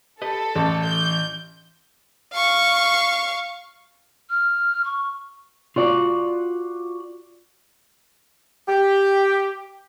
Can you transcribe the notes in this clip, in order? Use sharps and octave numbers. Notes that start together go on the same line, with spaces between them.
G4 A4 B4 D#5
A1 E3
G6
F5 C#6
F6
C#6
F4 F#4 D5
G4